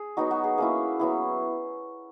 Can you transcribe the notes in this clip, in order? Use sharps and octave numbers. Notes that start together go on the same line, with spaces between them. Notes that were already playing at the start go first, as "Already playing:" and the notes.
Already playing: G#4
F#3 B3 D#4 F#4
F#4
G#4
A#3 C#4 E4 G#4
F#3 B3 E4